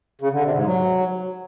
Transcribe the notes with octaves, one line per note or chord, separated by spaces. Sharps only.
C#3
D3
C3
G#2
F#3